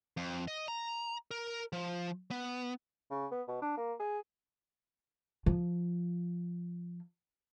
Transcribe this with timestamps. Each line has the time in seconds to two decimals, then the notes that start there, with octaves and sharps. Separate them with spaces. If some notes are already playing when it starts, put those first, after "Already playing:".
0.17 F2
0.48 D#5
0.68 A#5
1.31 A#4
1.73 F3
2.31 B3
3.11 C#3
3.31 B3
3.48 B2
3.62 D4
3.78 A#3
4.00 G#4
5.46 F3 F4